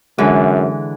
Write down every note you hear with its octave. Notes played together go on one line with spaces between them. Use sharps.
F#2 D3 E3 G#3